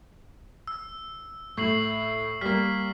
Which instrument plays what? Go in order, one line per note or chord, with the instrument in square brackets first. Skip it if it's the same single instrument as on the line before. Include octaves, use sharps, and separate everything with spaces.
[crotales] E6
[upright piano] A2 [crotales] C#6 C7 F#7
[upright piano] G3 A#3 [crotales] F6 B6